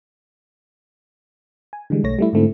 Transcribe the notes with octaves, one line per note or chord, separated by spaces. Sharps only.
G#5
D3 E3 G3 G#3
B1 A3 C#5 A#6
G3 A3 E4
G#2 D3 A3 C4 E4